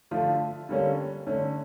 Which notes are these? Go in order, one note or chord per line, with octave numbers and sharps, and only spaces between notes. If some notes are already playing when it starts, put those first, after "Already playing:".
D3 F3 A3 F4
D3 G3 A#3 C#4
D3 A3 C#4